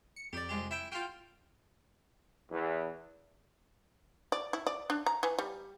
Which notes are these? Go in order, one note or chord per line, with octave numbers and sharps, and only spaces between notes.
C#7
F2 G4 D5
C2 G#3 G4
E4 E5 G5
F4 F#4 G5 F6 G6
E2
D5
E4
D5
D4
A#5
E3
G3